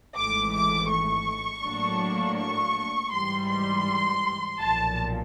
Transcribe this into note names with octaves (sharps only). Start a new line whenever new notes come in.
G#1 G#2 E3 A3 D6
D6
C#6
A2 F#3 A#3 D4
C#6
G#2 E3 G3 C6
C6
B1 A#2 F3 A5